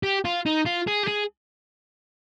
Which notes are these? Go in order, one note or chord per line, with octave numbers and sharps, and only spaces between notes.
G4
F4
D#4
F4
G#4
G4
G#4